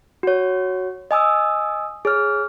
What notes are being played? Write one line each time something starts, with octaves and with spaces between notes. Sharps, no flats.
F#4 C#5
D#5 G#5 D#6 E6
G#4 C#5 F6